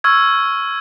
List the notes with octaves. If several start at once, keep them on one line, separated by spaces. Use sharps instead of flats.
C#6 E6 F6 G#6